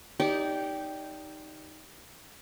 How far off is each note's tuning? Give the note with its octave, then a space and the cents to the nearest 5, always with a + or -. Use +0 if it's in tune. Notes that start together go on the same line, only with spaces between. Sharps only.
D#4 +0 G4 +0 D5 -25